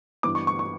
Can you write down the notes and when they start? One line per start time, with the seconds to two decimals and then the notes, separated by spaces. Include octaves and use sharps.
0.23 G2 E3 B3 D6
0.35 C#6
0.47 C#6
0.59 C#6